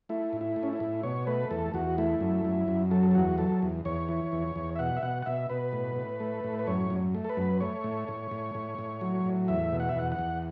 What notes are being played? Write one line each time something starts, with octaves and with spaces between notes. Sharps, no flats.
A3 E4
A2
E4
A3
C#4
E4
A2
B2 C#5
A3 B4
E2 A4
E2 F#4
A3 E4
F#2
F#2
F#2
F#3 A4
A4
E2 F#4
F#3 A4
E2
E2 C#5
E3
E2
E2
E5
B2 F#5
E5
B2 F#5
F#5
B2 E5
B2 B4
A2
A2
A3
A2
B4
F#2 C#5
F#2
A3
A4
B4
F#2
A3 C#5
A2
A2
A2
A2
A2
F#3
A2
E2 E5
B2
F#5
E5
E2 F#5
F#5
E2